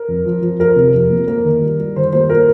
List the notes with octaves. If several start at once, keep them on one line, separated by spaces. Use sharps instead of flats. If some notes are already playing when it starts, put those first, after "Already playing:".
Already playing: A#4
F2
F3
F3
F3 A#4
C3
F2
A#3
A#3 A#4
D#3
G3
G3
D#3 C5
A#3 C5
A#2 A#4